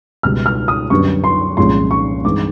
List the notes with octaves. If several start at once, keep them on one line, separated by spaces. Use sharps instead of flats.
C#2 B2 G3 F6
F6
D#6
F#2 D3 G3 B3 C#6
C6
C2 A#2 F3 G#3 C#4 C6
C#6
G2 E3 G#3 C4 D#4 D6